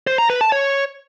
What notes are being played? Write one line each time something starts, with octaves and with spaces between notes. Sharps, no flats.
C5
A#5
B4
A5
C#5